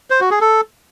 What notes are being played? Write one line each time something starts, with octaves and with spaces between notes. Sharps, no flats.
C5
F#4
G#4
A4